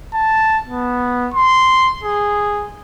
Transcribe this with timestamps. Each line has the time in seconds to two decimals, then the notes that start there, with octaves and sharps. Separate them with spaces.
0.14 A5
0.68 B3
1.34 C6
2.03 G#4